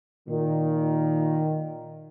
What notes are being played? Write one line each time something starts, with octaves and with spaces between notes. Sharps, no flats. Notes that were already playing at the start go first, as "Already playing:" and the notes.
A#2 D#3